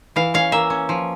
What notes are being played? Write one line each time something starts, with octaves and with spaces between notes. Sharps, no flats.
E3 F5
C#4 F5
A#3 E5
C#4
F3